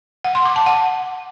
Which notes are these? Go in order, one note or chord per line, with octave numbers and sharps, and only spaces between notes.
F#5
C6
D6
A5
F#5